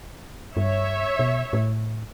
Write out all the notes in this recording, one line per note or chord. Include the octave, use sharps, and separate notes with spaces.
G2 C#5 E5
B2
A2